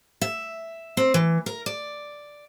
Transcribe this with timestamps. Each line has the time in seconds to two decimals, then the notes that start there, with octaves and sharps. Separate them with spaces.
0.21 E5
0.97 C4
1.14 E3
1.46 A#4
1.66 D5